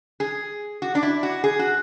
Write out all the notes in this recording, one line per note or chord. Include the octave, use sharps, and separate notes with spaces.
G#4
F#4
D4
E4
F#4
G#4
F#4